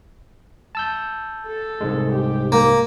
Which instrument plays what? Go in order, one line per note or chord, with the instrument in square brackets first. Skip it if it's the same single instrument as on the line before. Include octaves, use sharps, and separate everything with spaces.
[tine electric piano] A5 E6 G6
[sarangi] A4
[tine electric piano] C2 G#2 G#3
[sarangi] G4
[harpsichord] A#3